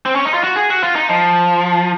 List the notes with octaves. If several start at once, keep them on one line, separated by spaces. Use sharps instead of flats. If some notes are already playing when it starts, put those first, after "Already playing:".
C4
C#4
D#4
F4
F#4
G#4
F#4
F4
D#4
F3